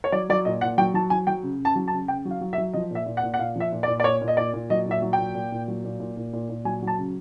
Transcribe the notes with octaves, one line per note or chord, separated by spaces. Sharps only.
C#5
F#3 D5
F#3 D5
A#2 D#5
A#2 F#5
F#3 G5
F#3 A5
F#3 G#5
F#3 G5
C#3
C#3
A5
F#3
A5
C#3
C#3 G5
F#3
F5
F#3
E5
F#3
F3 D#5
A#2 E5
A#2
F#5
A#2
F#5
A#2 F5
F3 E5
A#2
D5
A#2
D5
A#2 C#5
A#2
D#5
A#2 D5
A#2
F#3 D#5
A#2 E5
F#3
G5
A#2
A#2
A#2
F#3
A#2
A#2
A#2
A#2
A#2
F#3 G#5
F#3
A5
C#3